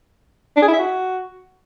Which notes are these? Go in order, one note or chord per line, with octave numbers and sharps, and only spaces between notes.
D4
G#4
E4
E5
F#4